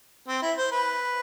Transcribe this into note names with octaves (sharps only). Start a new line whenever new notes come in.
C4
E4
C5
B4